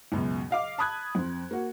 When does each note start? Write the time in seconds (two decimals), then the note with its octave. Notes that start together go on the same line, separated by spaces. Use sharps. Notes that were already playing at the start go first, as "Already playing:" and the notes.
0.12 C#2 F#2 B2
0.50 D#5 F5 D6
0.78 A5 B5 D#6 F#6 G#6
1.15 F2 C4
1.51 A#3 F#4